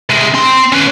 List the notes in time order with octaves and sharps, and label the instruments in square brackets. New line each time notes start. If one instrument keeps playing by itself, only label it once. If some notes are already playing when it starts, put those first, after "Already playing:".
[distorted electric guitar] C3 G#3
C4 C6
C#4 B4